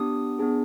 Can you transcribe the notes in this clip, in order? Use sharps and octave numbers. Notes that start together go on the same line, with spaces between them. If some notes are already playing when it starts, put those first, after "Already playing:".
Already playing: B3 D4 G4 D#6
B3 D4 G#4